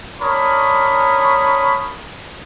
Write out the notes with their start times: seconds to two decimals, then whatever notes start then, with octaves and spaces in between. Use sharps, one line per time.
0.22 D4 A#4 C#5 B5 D#6